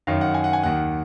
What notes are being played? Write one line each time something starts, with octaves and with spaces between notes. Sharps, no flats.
F#2 D#3 F5
F#5
G#5
F#5
G#5
D#2 D#3 F#5